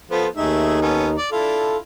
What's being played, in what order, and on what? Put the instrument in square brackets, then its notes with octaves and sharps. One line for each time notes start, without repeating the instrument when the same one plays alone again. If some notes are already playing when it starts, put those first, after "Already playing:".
[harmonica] F3 B3 F4 [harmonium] A4 C5
[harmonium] D#2 D#4 [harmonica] A3 G#4 E5
[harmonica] B3 C#4 A4
D5
[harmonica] D4 E4 F4 [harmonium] A4